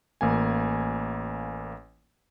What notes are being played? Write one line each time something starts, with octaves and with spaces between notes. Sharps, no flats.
A1 A#3 G#5